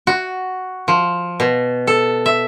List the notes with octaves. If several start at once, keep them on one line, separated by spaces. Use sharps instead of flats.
F#4
F3
B2
A4
E5